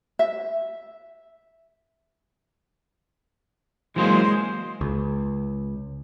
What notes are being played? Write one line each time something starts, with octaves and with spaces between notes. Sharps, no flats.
E5
E3 F#3 G#3 A#3 C5
C#2